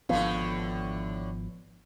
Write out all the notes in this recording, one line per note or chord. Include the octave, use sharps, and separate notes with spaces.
G#1 A2 D3 F3 B3 F5